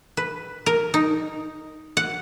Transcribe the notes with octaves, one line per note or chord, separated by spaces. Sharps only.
B4
A#4
D#4
F#5